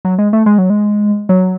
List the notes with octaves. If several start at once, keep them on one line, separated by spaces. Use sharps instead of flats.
F#3
G#3
A3
G#3
F#3
G#3
F#3